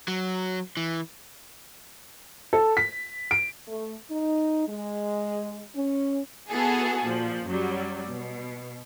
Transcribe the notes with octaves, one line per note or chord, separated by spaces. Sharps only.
F#3
E3
A4
B6
D7
A3
D#4
G#3
C#4
B3 E4 F#4 G#4 A4
A#2 F3
F#2 F#3 G3
B2